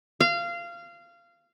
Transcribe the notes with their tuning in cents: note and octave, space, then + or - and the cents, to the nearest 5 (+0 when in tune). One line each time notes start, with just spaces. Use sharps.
F5 -20